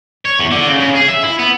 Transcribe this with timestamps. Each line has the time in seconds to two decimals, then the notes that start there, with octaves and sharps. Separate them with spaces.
0.25 C#5
0.39 E2
0.51 D3
0.67 C#3
0.80 C#3
0.96 G#4
1.09 E5
1.24 E4
1.39 B3